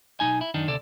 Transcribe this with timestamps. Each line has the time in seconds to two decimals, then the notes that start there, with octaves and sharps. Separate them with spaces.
0.20 B1 C3 D#4 G#5
0.41 E4
0.54 F#2 D#3 D4 D#4
0.67 D2 C3 A4 D5